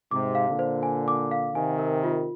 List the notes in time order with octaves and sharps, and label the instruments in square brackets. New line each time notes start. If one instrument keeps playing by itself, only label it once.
[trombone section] G#2 C3 [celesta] D6
[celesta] F5
[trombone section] A#2 D3
[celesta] C5
G#5
D6
F5
[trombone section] C3 D#3 [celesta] G#5
[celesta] A#4
F4